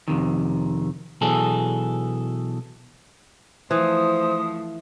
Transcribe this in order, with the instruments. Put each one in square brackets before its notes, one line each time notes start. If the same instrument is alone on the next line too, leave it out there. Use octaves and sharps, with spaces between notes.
[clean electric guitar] F2 G#2 C3 D#3
B1 B2 E3 G#4 A4
[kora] E3 [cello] F3 A3 [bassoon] C5 [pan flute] D#6